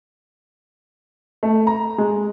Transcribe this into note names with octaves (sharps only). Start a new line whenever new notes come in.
A3
A#5
G#3